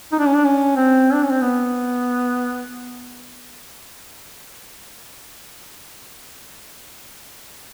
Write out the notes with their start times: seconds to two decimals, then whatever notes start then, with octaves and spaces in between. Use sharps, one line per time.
0.12 D#4
0.19 D4
0.27 C#4
0.35 D4
0.45 C#4
0.76 C4
1.13 D4
1.23 C#4
1.31 C4
1.41 B3